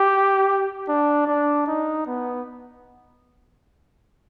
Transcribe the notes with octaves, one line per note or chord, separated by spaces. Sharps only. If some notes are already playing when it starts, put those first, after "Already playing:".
Already playing: G4
D4
D4
D#4
B3